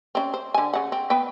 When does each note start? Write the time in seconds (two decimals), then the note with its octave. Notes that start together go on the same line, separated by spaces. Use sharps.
0.15 C4 C#4
0.34 C5
0.54 D3 G#5
0.74 C#3 F#5
0.92 C4
1.10 B3 B4 G5